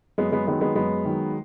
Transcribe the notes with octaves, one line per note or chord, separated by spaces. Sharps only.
F#2 G#3 B3
G#3 B3
D#3 F#3 G#3 B3
G#3 B3
F#2 G#3 B3
D#3 F#3